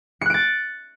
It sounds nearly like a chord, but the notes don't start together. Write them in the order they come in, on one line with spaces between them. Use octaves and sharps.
C#7 F#6 D7 A6